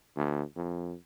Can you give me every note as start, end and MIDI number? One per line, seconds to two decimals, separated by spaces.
0.16 0.42 38
0.56 0.94 41